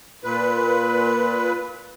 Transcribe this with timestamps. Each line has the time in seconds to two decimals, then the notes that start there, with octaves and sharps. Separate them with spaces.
0.24 A#2 B4